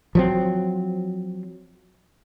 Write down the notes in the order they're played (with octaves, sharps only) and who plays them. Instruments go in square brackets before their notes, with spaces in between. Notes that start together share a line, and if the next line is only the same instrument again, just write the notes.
[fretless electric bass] F3 F#3 C4